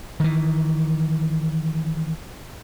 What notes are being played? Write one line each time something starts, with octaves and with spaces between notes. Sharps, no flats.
D#3 E3